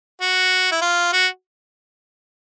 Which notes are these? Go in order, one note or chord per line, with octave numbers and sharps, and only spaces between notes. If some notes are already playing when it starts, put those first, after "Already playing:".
F#4
E4
F4
F#4